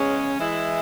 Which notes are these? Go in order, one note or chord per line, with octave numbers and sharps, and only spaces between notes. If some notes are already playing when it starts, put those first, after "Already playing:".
Already playing: E2 C#3 G#3 C#4
E3 G#3 E4